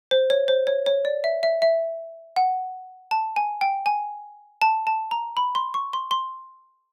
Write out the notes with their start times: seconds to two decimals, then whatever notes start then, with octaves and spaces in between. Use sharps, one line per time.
0.11 C5
0.30 C#5
0.48 C5
0.67 C#5
0.86 C#5
1.05 D5
1.24 E5
1.43 E5
1.62 E5
2.36 F#5
3.11 A5
3.36 G#5
3.61 G5
3.86 G#5
4.62 A5
4.87 A5
5.11 A#5
5.37 B5
5.55 C6
5.74 C#6
5.93 C6
6.11 C6